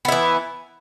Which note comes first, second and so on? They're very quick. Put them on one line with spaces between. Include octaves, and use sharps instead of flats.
B3 E4 E3